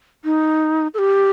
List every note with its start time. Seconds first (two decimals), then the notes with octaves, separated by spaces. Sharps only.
0.25 D#4
0.94 A4
0.98 G4